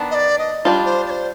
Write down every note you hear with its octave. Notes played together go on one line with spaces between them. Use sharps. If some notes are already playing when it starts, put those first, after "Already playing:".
Already playing: D#3 B3 D4
D#5
D5
D#5
G3 D4 F4
C5
D5
C5